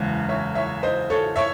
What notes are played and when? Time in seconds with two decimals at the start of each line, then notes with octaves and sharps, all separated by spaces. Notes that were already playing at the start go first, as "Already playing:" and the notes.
Already playing: F#1 E2 C#3 G#3
0.29 C#5 E5
0.55 C#5 E5
0.83 C5 D#5
1.10 A4 C#5
1.36 C#5 E5